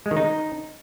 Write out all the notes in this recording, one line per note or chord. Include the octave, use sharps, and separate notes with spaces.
G#3
D#3
D#4